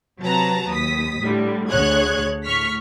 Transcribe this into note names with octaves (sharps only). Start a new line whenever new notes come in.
C3 F#3 B4 A5 A#5
D#2 D#6 B6
A2 D3 G3
D2 D3 G#4 C#5 F#6 G#6
A2 C#6 F6 B6